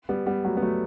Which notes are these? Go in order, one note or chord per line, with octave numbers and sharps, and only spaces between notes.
G3 B3
G3 B3
F#3 A3
B3
F#3 A3